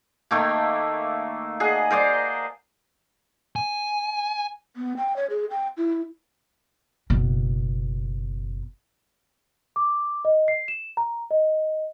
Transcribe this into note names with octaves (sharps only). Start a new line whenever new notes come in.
D#3 A3 A#3
G#4 D#5 F#5
A#4 C5 D5 D#5
G#5
B3
G5
C#5
G#4
G5
E4
F#1 B2
D6
D#5
C7
E7
A#5
D#5